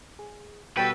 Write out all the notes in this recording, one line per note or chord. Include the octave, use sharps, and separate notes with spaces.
G#4
B2 G3 B3 F#4 A4 B4 G5